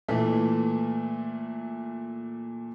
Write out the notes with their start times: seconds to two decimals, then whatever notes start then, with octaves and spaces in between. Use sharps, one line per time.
0.08 A#2 E3 A3